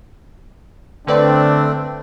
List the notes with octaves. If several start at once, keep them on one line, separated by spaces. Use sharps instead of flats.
D3 A3 C4 D4 B4 D5